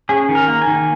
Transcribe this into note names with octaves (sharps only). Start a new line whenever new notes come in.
C#4 G#4
D#3
A#4
A#3
G#5
D#3